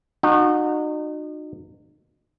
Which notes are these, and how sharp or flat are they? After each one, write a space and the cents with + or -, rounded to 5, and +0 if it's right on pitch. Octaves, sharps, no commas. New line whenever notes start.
D#4 -35 F#4 -25